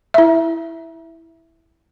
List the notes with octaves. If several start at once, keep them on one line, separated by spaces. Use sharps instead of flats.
E4 E5